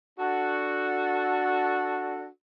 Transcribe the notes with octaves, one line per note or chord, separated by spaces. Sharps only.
D4 F#4 A4